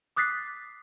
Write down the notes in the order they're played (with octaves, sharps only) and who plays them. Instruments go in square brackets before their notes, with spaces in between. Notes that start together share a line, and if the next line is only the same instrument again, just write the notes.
[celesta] D6 D#6 F#6 A6 B6 C7